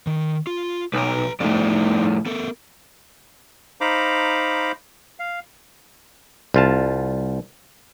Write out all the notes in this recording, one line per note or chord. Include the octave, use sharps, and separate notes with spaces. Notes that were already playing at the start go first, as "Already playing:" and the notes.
D#3
F4
B1 B4 A#5
F2 A2 D#4 C5 D5
B3 A4 A#4
D#4 C5 F5 A#5 B5 D6
F5
C2 F4 A5